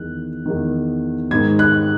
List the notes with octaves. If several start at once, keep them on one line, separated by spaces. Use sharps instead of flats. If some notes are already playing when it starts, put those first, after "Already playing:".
Already playing: E2 D#3 F#6
E2 D#3
G#2 D#3 G#6
F#6